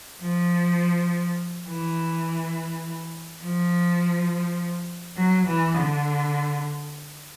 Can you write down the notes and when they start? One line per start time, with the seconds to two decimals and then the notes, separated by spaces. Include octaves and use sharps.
0.22 F3
1.67 E3
3.42 F3
5.17 F#3
5.46 E3
5.75 D3